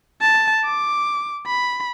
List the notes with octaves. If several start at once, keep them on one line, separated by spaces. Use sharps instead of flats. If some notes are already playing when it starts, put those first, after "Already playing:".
A5
D6
B5